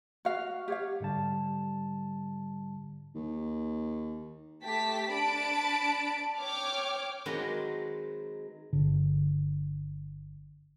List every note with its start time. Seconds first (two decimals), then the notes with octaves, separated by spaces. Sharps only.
0.25 F#4 F5
0.68 G4 C#5 F5
1.00 G#2 D3 G3 A5
3.15 D#2
4.63 A3 G4 A5 B6
5.13 D4 A5 B5 D7
6.39 C#5 G5 D6 F6
7.26 D#3 F#3 G#3 C4 F#4 B4
8.73 G1 D3